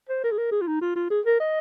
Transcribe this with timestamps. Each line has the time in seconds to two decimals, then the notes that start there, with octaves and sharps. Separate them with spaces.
0.09 C5
0.24 A#4
0.31 G#4
0.38 A#4
0.52 G#4
0.61 F4
0.67 D#4
0.81 F4
0.96 F4
1.10 G#4
1.26 A#4
1.40 D#5